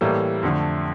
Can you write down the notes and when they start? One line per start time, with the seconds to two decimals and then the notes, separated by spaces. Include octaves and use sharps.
0.01 A2 E3 G3 A#3 A4
0.43 F2 D3 A3